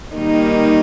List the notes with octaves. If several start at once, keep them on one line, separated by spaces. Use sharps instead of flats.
D#3 G3 A#3 D#4